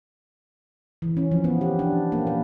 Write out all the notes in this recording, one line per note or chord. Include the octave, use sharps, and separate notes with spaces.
E3
C#4
F3
B3
G4
D4
A#3
B4